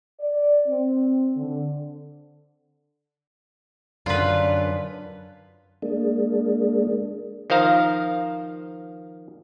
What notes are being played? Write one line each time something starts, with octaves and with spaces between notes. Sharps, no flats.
D5
C4
D3
F#2 D3 F4 B4 D5
G#3 A#3 D4
D#3 F3 C5 F5 A#5